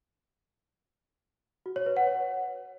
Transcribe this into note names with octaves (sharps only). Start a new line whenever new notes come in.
F#4
C#5
B4
F#5
C#5